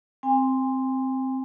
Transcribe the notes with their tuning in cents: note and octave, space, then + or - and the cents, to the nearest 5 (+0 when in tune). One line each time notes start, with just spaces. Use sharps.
C4 +0 G#5 -35